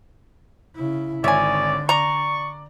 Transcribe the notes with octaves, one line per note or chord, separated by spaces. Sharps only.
C#3 E4
G#1 D3 C#5 D5 E5 G#5
D5 A#5 C#6